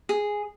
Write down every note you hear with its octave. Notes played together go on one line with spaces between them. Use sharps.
G#4